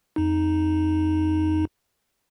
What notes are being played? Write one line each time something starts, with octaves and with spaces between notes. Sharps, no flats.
F2 D#4